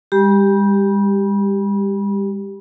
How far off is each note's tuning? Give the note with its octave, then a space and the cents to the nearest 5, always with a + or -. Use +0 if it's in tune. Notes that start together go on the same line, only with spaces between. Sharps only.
G3 +45 G4 +0 B5 -35